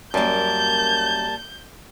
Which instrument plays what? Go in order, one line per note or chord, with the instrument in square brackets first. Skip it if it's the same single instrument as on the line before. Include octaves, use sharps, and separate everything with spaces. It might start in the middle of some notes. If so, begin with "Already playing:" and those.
[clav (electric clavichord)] F#2 [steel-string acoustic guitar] G3 A#3 [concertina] A5 [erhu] G6